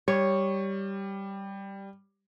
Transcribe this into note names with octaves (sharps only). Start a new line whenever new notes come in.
G3 C#5